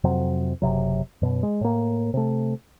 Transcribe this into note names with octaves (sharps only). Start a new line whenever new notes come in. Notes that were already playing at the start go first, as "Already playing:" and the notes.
F2 C3 F#3 C4
F#1 B1 C3 F#3
F#2 B2
G#3
A2 A#3
C3 A3